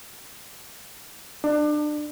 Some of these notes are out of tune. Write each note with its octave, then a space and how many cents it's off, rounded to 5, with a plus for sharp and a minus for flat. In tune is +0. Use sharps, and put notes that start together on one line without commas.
D4 +30